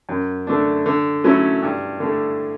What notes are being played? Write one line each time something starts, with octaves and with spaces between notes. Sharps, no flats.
F#2
D3 A3 D4
D3
F#3 A3 C#4 E4
G2
D3 A3